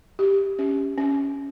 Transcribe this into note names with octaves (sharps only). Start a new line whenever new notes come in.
G4
C#4
C#4